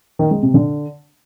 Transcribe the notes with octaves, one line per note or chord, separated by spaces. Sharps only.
D#3
G#3
C3
D3